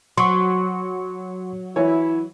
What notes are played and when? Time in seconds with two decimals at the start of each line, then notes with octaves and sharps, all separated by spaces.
0.17 F#3 C6 C#6
1.76 E3 E4 C#5